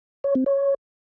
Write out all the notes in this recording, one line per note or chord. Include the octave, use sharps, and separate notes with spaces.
C#5
C4
C#5